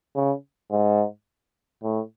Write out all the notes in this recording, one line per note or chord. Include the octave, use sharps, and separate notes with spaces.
C#3
G#2
A2